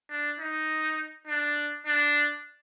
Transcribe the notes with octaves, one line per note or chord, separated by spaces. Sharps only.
D4
D#4
D4
D4